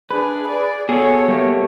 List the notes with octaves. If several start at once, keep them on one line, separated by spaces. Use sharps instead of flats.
D4 G#4 B4
G#4 D5
B2 G#4 A4 C#5
G3 A3 A#3